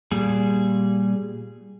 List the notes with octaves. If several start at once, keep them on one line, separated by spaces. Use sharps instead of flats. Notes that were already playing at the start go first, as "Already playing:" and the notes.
A#2 G3 G#4